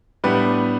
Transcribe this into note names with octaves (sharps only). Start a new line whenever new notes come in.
A2 G3 B3 D4 B4